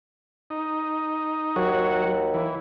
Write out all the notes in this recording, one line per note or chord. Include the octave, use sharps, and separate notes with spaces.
D#4
D#2 F#3 F#4 C#5
E3